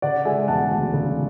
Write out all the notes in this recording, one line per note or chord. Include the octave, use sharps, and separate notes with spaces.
C#3 D5 F#5
G#3 E5 G#5
E1 F#5 A5
D2
C#3